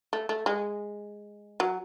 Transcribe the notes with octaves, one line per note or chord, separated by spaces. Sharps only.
A3
A3
G#3
F#3